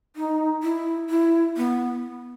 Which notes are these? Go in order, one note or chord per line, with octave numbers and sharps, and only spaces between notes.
D#4
E4
E4
B3